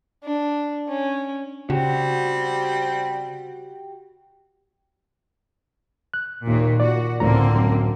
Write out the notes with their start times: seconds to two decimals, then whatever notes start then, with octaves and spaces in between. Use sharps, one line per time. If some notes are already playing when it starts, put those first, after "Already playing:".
0.24 D4
0.88 C#4
1.70 C#3 G3 C4 F#4 G4
6.14 F#6
6.47 D#2 A#2 D#3
6.80 A#2 F#4 D5
7.20 C#2 A2 D3 A#3 C4 A#5
7.55 F#2